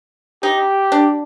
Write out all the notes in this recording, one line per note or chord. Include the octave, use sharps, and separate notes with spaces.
D#4 G4
D4